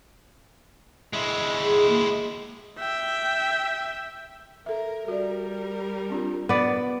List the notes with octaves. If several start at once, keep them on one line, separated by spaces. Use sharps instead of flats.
G#3 E4
G#4
A#3
E5 G5
A4 A#4 E5
G3 F#4 G4 A#4 D5
C4 D4 F4
B3 D5